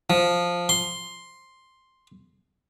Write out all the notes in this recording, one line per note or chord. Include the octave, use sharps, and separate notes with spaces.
F3
C6